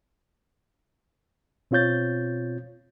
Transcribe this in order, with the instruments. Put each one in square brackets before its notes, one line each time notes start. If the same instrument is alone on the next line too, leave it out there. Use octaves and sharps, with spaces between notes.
[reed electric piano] B2 C4 F4 C#5 G6 A6